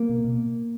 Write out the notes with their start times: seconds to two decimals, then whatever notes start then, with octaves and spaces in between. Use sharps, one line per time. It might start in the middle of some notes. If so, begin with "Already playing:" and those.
Already playing: A#3
0.09 B2
0.25 B2